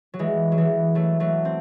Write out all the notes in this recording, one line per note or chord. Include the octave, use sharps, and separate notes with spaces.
F#3
E3 G#3
F#3
E3 G#3
F#3 A3
F#3 A3
C4